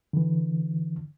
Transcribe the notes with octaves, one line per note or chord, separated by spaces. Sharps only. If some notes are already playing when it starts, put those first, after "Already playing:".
D3 E3